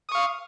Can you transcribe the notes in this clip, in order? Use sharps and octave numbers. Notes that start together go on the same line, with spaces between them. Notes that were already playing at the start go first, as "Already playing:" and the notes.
F5 C#6 D#6